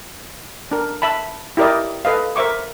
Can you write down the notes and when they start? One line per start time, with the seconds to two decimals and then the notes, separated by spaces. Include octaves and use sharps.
0.71 D4 A#4
1.02 E5 A5 B5
1.57 E4 G4 A#4 D5 D#5
2.05 A4 B4 D#5 F5
2.36 A#4 C5 E5 C#6 D6